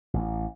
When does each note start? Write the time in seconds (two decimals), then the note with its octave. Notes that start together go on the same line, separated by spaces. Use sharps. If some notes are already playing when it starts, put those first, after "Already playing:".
0.14 A1